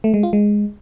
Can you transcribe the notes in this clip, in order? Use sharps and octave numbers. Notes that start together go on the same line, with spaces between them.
A3
G#3
F4
G#3